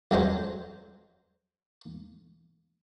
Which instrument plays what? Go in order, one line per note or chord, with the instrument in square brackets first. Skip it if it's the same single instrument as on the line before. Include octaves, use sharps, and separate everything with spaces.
[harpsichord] F2 F#3 G#3 C5